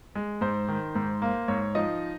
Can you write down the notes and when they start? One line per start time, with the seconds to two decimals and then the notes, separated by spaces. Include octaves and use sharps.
0.15 G#3
0.41 G#2 C5
0.69 D#3
0.95 G#2
1.22 A#3
1.48 G#2 C#5
1.75 F3 D#4 D#5